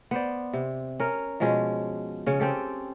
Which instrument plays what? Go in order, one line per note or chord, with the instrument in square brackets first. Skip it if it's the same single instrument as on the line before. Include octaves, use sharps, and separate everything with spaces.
[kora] B3 C5 D5
C3
C#4 A#4
B2 F3 G#3 C#4
C#3 C#4
C4 C#4 G4 A4